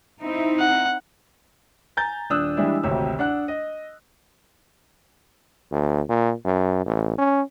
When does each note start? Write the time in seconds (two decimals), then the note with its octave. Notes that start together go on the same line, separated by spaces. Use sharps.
0.23 C4 D#4 E4
0.59 F#5
1.97 G#5 A#5 G6 A6
2.30 D#1 D4 D#6 E6 F#6
2.57 E3 G3 G#3 D4 E4
2.83 G#1 D2 C3 G4 C#5 E6
3.19 D4 F#5 F#6
3.48 D#5
5.72 D2
6.10 A#2
6.45 F#2
6.86 A1
7.18 C#4